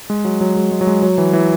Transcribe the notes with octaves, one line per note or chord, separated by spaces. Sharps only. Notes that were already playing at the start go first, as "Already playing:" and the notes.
G#3
F#3
F#3
G#3
G#3
F#3
G#3
F#3
E3
E3